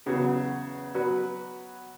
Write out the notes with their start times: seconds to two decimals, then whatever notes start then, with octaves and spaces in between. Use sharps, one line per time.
0.06 E2 C#3 F#3 B3 F#4
0.95 F#3 B3 F#4 B4